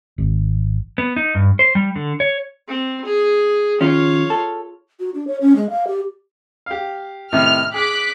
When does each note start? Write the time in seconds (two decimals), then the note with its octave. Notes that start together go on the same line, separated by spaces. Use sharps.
0.18 G#1
0.98 B3
1.16 D#4
1.35 G2
1.59 C5
1.75 G3
1.96 D3
2.20 C#5
2.68 C4
3.05 G#4
3.81 D#3 F3 C#4 F4 C#5
4.30 A4
5.00 F#4
5.14 D4
5.27 C#5
5.41 C#4
5.56 G#3
5.70 F5
5.87 G4
6.66 G4 F5
7.33 A2 C3 D#3 F6
7.74 G#4 D6 F#6 B6